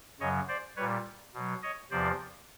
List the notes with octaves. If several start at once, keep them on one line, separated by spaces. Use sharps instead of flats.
F#2 C#3 F#3 C#5 D#5
C5 D5
A#2 G3 B4 C#5
B2 F#3
C#5 D#5
E2 C3 F3 C5 D5